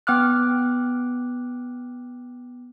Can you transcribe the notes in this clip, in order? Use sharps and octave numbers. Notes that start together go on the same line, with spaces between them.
B3 G5 D6 F6 F#6